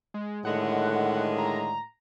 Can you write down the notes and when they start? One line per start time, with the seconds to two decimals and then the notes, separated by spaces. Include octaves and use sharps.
0.14 G#3
0.45 A2 D3 D#3 G#3 F#5
1.38 A#5